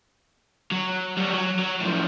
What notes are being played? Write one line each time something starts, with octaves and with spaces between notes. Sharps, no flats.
F#3
G3 F#4
F#3
F#3
A2 F3